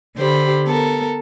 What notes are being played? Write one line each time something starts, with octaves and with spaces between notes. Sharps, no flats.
D3 G4 C5 B5
B3 A4 A#4